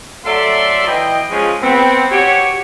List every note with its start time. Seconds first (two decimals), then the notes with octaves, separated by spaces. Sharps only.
0.24 F#3 A3 A4 D5 E5 C6
0.86 E3 D#5 G5
1.30 F3 G#3 C#4
1.61 B3 C4
2.10 F#4 G4 C#5